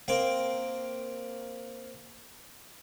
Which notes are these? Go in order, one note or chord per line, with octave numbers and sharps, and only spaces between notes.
A#3 C4 G5